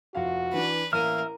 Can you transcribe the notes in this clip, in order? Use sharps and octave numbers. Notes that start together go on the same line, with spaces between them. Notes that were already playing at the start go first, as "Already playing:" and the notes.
F1 F4 F#4 F5
E3 D4 B4
A1 A#3 A#4 E5 F6 D#7